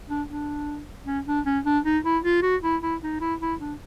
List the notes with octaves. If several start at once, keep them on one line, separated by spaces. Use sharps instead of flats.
D4
D4
C#4
D4
C#4
D4
D#4
E4
F4
F#4
E4
E4
D#4
E4
E4
D4